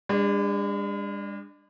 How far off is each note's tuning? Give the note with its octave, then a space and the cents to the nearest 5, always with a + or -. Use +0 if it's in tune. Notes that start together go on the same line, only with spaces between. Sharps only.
G#3 -45 D4 +0